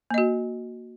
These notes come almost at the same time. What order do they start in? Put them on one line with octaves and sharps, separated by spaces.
A#3 D#5 F#4